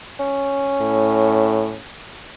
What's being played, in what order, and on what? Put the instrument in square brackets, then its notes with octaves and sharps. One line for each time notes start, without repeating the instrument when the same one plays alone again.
[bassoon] C#4
[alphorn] A2